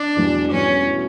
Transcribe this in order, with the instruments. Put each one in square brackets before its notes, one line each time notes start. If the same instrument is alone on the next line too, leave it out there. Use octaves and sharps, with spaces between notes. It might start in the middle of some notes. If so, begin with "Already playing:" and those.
Already playing: [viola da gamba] D4
[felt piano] E2 B2 G3
[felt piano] E2 B2 G3 [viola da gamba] C#4
[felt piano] B2 A3 E4